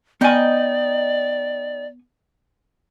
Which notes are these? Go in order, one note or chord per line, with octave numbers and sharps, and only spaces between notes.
B3 D#4 D5 D#5 G5 G#5